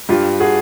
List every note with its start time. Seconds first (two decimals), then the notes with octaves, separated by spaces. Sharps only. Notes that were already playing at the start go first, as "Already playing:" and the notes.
0.09 G2 F4 G4
0.40 F#4 G#4